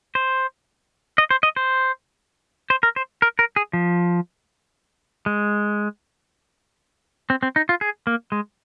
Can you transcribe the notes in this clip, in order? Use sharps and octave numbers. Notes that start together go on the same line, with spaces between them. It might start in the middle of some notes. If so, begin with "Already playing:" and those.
C5
D#5
C5
D#5
C5
C5
A#4
C5
A#4
A#4
G#4
F3
G#3
C4
C4
D#4
F4
G#4
A#3
G#3